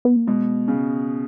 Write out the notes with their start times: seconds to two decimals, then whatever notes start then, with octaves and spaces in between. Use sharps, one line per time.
0.05 B3
0.16 A#3
0.27 B2 G#3
0.68 C#3